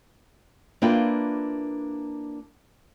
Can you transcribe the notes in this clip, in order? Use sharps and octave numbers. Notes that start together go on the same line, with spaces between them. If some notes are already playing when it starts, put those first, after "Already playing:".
A#3 D4 E4 F4 B4 G5